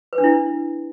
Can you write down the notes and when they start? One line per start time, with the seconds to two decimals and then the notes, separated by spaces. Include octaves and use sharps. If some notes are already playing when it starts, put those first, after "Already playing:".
0.13 B4
0.18 D4
0.24 E4